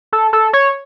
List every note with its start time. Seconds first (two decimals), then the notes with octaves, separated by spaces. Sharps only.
0.13 A4
0.33 A4
0.53 C#5